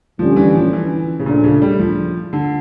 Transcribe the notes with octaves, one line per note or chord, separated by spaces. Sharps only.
D3 F3 G3 C#4
E3
F3
E3
C#3
A#2 F3 A3 D4 A4
C#3
G3
F3
D3